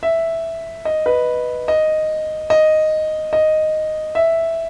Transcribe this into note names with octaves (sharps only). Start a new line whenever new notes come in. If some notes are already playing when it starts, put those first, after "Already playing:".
E5
D#5
B4
D#5
D#5
D#5
E5